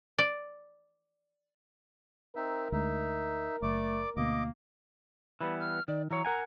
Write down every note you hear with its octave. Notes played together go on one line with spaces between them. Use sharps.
D5
C4 D#4 A#4 E5
D2 G#3 D#4 E5
F#1 A3 D5 D6
D2 B2 A#3 D#5 D6
E3 G3 B3 B5
F6
D#3 D5
E3 F#3 C#5 A#5
A#4 F#5 G#5